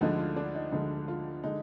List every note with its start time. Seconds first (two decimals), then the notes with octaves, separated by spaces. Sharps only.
0.01 D2 D3 F3 G#3 D#4
0.19 F4
0.36 D4
0.55 D#4
0.72 D2 D3 F3 G#3 D#4
1.08 F4
1.44 D3 G#3 D#4